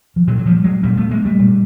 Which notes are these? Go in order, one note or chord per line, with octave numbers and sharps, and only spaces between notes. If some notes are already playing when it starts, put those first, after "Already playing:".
F3
A#2 E3 F#3
F#3
F3 G3
F#3 G#3
A#2 G3 A3
A3 B3
G#3 A#3
G3 A3
A#2